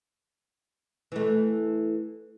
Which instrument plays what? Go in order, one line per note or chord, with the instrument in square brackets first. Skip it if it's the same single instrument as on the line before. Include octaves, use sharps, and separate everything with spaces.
[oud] E3 A3